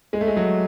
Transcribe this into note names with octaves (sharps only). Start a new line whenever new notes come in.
G#3
A3
G#3
F#3